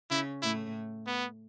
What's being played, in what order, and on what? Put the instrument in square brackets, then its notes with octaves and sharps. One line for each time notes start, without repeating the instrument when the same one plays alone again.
[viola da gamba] C#3 C#4 [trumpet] E4
[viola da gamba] A2 A3 [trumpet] E4
[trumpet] B3